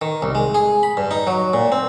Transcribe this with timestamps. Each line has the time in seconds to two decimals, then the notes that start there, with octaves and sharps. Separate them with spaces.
0.02 D#3
0.22 C2
0.35 G#3
0.55 G#4
0.83 B5
0.97 G2
1.11 D#4
1.27 F#3
1.53 A#2
1.72 C4